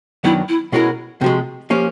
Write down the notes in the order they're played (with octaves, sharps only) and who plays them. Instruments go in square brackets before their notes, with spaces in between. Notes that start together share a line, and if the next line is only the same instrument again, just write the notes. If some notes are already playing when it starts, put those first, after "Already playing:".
[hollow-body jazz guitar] F#2 D#3 F#3 B3 D4 [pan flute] E4
[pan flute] E4
[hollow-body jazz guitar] B2 G#3 C#4 F#4 A#4 [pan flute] E4
[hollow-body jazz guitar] C3 F3 G#3 [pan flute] F#4
[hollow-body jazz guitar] F3 A#3 C#4 [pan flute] G4